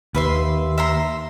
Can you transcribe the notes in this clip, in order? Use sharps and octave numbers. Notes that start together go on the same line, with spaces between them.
D#2 B4 E5 C6
E5 A#5 C6